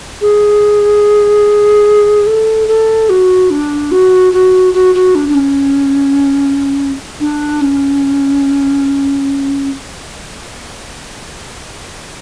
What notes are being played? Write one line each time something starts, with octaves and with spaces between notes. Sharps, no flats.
G#4
A4
A4
F#4
D4
F#4
F#4
F#4
F#4
D4
D4
C#4
D4
C#4